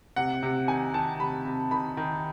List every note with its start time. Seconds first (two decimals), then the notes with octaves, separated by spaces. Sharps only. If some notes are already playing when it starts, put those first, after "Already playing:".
0.16 C3 F#5
0.43 C3
0.68 D#3 G#5
0.94 D#3 A5
1.19 C3 B5
1.45 C3
1.71 D#3 B5
1.97 D#3